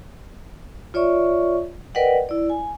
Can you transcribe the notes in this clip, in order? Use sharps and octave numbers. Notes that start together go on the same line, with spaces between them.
F4 C#5 D5 E5 C#6
A#4 B4 D5 D#5 F#5 G5
E4 D5
G#5